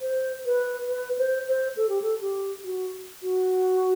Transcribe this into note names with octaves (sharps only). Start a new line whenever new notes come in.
C5
B4
B4
C5
C5
A4
G4
A4
G4
F#4
F#4